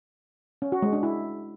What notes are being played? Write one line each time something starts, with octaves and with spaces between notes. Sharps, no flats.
C#4
F#4
G#3
D4
E4